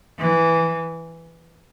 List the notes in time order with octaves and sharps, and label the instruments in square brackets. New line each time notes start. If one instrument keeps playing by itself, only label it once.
[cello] E3